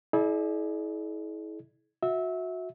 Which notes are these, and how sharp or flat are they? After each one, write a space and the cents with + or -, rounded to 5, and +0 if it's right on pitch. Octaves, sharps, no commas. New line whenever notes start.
E4 -30 G#4 +45 D5 +20
F#4 -25 E5 -20